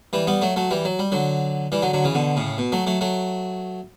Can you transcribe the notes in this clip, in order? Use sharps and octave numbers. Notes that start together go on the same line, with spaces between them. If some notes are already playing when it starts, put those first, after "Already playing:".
E3 G3
G3 B3
F#3 A3
F#3 A3
E3 G3
F#3
G3
D3 F#3
E3 G3
D3 F#3
D3 F#3
C#3 E3
B2 D3
A2 C#3
B2
F#3 A3
F#3 A3
F#3 A3